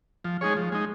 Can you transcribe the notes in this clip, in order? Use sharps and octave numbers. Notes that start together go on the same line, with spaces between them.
F3
G#3 D#4 G#4 C#5
F3
G#3 D#4